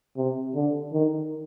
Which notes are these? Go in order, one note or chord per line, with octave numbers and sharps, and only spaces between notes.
C3
D3
D#3